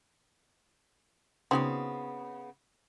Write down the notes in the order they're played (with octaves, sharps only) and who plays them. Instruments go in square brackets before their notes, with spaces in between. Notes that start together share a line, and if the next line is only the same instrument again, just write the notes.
[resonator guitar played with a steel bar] C#3 B3 [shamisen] C4 D#4 F#4